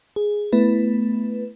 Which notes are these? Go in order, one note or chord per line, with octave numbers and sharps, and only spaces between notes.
G#4
A3 B3 E4 B4